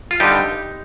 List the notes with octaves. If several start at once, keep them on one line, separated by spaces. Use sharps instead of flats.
F4
G2 D3 G3 D#4 G4